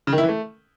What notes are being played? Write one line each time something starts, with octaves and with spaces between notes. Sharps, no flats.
C#3
D#3
E4
E3
A3